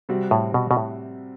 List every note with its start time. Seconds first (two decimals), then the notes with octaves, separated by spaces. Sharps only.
0.09 C3 G3 C4 F#4
0.31 A2
0.54 B2
0.71 B2
0.77 A2